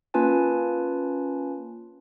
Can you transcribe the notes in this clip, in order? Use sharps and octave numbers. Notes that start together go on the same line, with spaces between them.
A#3 C#4 F4 B4 G#5 A5